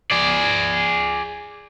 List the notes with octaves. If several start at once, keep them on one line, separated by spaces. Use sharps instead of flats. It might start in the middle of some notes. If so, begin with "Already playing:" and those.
G#4 D5